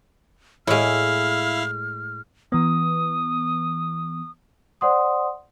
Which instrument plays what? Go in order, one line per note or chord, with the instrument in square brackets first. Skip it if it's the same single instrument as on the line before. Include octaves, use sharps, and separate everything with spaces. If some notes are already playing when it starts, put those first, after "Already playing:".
[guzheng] A2 G#3 [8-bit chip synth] E4 F5 [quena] F6
[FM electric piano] E3 B3 [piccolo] D#6
[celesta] C5 D5 F#5 C6 D#6